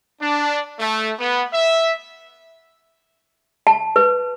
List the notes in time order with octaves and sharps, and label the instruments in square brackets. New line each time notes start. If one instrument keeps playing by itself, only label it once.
[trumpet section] D4
A3
B3
E5
[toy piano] A5
B4